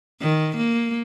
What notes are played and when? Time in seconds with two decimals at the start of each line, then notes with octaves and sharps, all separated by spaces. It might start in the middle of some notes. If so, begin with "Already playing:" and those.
0.22 D#3
0.57 A#3